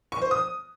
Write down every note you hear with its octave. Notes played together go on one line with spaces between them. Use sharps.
C#6
C5
D#6